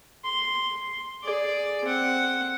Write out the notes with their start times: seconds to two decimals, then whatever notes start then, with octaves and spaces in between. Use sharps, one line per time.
0.24 C6
1.23 G#4 D5
1.84 C4 F#5